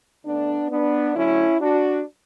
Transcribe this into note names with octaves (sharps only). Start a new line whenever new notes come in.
D3 A3 B3 D4
B3 D4
D3 F#3 A3 C#4 E4
D4 F#4